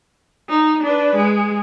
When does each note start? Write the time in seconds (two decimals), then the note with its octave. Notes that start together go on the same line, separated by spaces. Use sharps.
0.49 D#4
0.83 D4 B4
1.16 G#3